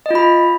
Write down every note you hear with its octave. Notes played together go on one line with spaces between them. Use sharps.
F4 D#5 B5